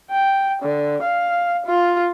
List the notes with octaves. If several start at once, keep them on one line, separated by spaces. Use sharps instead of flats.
G5
D3
F5
F4